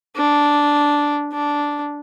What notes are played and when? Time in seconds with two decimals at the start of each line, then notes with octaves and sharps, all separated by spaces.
0.17 D4
1.32 D4